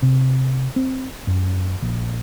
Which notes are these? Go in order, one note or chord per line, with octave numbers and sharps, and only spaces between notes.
C3
C4
F#2
A#1